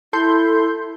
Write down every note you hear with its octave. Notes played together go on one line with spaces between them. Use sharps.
E4 A4 C6 G6